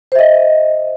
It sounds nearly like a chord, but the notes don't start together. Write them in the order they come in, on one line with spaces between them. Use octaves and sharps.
C5 E5 D#5